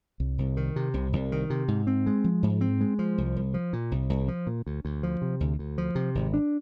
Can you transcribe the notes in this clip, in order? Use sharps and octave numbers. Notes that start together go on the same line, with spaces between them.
C2
C2
D#3
C3
C2
C2
D#3
C3
G#2
C4
G#3
F3
G#2
C4
G#3
F3
C2
C2
F3
A#2
C2
C2
F3
A#2
D2
D2
F3
C3
D2
D2
F3
C3
G#1
D4